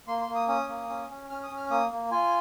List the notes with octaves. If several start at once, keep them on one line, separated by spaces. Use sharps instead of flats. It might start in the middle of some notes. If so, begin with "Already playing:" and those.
A#3 C6
C6
A#3
D#6
C#4 D#6
A#3
C#4
C#4
C#4 F6
D#6
C#4
F6
A#3 D#6
A#3
F4 G#5